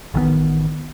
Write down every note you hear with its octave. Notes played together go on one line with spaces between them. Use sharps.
A1 D#3 F3 B3